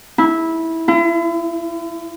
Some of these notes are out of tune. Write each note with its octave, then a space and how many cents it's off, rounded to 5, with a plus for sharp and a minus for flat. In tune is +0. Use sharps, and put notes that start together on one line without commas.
E4 -15
E4 +40